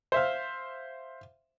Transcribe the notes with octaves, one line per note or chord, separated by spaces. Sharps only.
C5 E5 F5